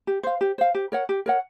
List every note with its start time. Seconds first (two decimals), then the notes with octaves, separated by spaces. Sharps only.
0.07 G4
0.23 C5 F5
0.41 G4
0.58 C5 F5
0.75 G4
0.92 A#4 C#5 F#5
1.09 G4
1.26 A#4 C#5 F#5